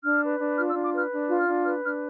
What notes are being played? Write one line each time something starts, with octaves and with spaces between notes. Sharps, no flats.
D4 F6
B4
D4
F4 F6
E6
D4
D6
B4 F6
D4
F4
F6
D4
B4 F6
D4 F6